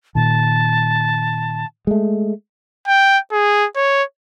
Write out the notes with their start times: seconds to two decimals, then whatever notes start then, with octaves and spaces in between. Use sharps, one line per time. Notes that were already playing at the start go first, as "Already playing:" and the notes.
0.15 A#2 D#3 A5
1.87 G#3 A3
2.87 G5
3.32 G#4
3.76 C#5